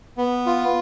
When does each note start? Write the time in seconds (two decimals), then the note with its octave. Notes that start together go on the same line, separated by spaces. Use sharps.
0.18 B3
0.46 F4